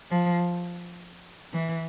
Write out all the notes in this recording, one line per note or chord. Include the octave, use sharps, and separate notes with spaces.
F3
E3